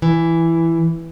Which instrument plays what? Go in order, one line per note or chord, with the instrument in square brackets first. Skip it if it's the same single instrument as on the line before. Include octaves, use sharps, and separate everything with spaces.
[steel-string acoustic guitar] E3